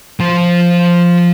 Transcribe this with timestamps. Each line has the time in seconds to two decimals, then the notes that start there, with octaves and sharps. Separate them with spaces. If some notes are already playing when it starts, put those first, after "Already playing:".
0.20 F3 C5